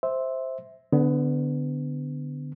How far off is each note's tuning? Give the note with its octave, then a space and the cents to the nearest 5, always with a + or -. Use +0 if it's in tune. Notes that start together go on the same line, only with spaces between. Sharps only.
C5 +0 E5 -10
D3 +0 B3 +25